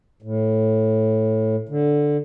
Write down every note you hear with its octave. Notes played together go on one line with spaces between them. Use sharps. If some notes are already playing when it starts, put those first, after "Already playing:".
A2
D3